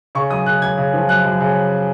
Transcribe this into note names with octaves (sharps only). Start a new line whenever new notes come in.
C#3 C#6
F#2 D#6
C#3 F#6
F#2 G#6
C#3
F3
F#2 F#6
F#2
C#3